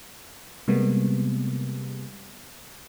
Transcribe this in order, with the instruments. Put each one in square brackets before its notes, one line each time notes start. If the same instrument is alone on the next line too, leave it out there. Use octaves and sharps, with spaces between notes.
[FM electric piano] C3 G3 G#3 A#3 B3